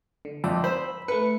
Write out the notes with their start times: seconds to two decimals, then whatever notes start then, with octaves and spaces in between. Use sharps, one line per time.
0.25 D3
0.44 F2 D5 E5 G5
0.64 C5 B5 E6
1.08 A3 B4 C#7